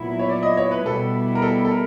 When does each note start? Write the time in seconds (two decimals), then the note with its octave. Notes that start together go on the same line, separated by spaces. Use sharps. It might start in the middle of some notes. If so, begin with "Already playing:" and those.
Already playing: A#2 F#3 B3 E4
0.19 C#5
0.29 D5
0.43 D#5
0.57 C#5
0.71 B4
0.86 B2 G3 B3 E4 A4
1.35 A#4
1.42 A4
1.65 A4
1.71 A#4